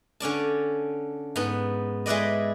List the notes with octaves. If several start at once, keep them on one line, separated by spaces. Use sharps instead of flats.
D3 C#4 D5 A5
G#2 B3
G#3 E4 B4 D5 D#5